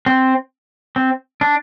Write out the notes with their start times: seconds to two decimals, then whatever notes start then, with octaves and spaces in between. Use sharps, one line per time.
0.06 C4
0.96 C4
1.41 D4